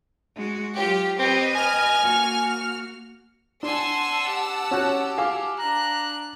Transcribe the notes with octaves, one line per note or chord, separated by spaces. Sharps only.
G#3 F#4
F#3 F4 G4
C4 G4 B4 D#5
G#5 F6
A#3 F#4
D4 F#5 G#5 A5 C6 E6
G4
C#4 F#4 F#6
F5 G#5 D6
D4 A#5 F#6